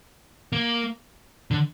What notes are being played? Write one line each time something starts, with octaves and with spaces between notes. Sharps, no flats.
A#3
D3